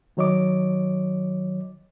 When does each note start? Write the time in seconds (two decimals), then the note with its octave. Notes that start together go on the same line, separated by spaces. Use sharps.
0.17 D#3 F#3 C#5 D#5 D6